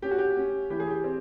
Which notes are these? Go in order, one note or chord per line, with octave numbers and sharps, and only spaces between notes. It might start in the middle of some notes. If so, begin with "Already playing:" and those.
C#4 G4
F#4
G4
C#4
E3 G4
G#4
G4
C4